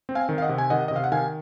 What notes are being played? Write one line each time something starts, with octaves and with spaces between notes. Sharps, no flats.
C4
F5 G#5
D#3
F5
D#5 F#5
C3
G#5
D#3 D#5 F#5
D#5
C3 F5
F#5
D#3 F5 G#5